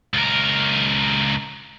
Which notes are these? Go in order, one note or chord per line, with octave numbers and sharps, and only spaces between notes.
C#2 A#4